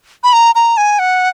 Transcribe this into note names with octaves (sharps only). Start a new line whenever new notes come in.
B5
A#5
A#5
G#5
F#5